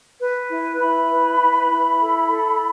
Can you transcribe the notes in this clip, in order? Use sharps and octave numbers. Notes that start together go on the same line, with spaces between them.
B4
E4
E4 B5
B4
E4
E4
A4
A4